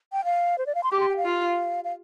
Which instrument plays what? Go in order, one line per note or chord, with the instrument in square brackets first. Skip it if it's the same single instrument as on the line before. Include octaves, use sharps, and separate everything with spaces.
[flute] G5
F5
C5
D5
F5
C6
[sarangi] G4 [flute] D6
[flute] C6
G5
F5
[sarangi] F4
[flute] F5